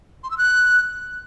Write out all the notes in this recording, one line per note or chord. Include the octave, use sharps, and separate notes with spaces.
C6
E6
F#6